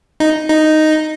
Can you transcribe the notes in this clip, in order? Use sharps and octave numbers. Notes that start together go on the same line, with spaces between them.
D#4
D#4